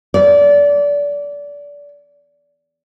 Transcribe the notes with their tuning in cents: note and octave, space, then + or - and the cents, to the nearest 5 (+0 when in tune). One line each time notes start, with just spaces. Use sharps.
D5 -25